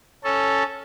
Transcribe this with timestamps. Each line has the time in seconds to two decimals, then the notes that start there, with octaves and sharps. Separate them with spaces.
0.24 C#4 A4